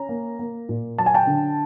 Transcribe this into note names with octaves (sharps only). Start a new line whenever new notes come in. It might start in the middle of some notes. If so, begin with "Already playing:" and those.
Already playing: C#4 A#5
A#3
A#3
A#2
F#3 A5
G#5
G5 A5
D3